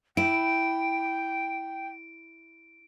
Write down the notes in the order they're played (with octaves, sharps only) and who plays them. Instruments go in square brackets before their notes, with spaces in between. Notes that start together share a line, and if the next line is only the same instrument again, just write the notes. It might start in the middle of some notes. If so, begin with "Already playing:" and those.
[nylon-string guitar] E4 [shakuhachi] G5 [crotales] D7